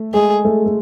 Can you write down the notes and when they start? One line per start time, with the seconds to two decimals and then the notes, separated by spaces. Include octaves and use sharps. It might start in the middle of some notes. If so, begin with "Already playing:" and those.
Already playing: A3
0.14 G#3 G#4
0.45 A3
0.66 A3